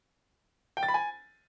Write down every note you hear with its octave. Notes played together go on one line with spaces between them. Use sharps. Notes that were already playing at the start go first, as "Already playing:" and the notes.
G5
A6
B5
G#5